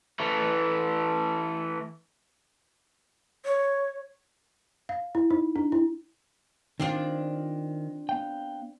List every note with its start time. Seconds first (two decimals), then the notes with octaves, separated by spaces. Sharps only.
0.20 E3 A3
3.45 C#5
4.89 F5
5.15 E4
5.31 D#4
5.56 D4
5.72 E4
6.80 D#3 C4 D4 F4
8.09 B3 F5 G5